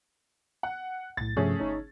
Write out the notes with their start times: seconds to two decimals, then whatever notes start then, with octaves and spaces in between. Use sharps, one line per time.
0.63 F#5
1.17 B1 A2 A6
1.37 G2 C3 F3 A3 C#4 G#4
1.60 G1 D#4 C#5